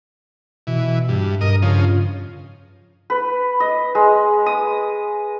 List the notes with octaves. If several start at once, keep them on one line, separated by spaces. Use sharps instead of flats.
B2 E3
G2
G2 A#4 D#5
C#3 F3
B4
D#5
G#3
D#6